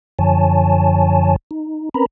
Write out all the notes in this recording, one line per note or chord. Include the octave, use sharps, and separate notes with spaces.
F#2 D3 F3 C#5 G#5 A5
D#4
C4 C#4 A#4 B4 A#5 B5